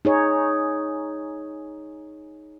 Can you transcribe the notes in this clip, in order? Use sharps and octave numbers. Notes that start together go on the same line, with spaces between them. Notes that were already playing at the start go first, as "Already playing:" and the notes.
D#4 G#4 C#5